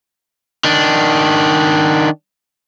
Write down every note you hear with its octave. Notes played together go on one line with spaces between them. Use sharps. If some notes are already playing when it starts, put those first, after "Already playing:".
D#3 D4